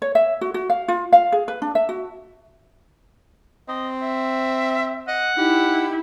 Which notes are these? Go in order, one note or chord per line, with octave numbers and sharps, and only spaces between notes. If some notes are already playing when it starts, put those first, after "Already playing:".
C#5
E5
F#4
F#4
F5
F4
F5
G#4
B4
D4
E5
F#4
C4 D#5
E5
D#5 F#5
D#4 E4 G4